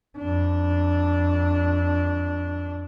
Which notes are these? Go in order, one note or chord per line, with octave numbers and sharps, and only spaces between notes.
F2 D4